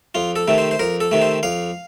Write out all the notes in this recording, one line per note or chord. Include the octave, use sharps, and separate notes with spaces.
F2 F4
A4
C3 D#3 A3
C5
C5
F2 A#4
A4
C3 D#3 A3
C5
F2 F5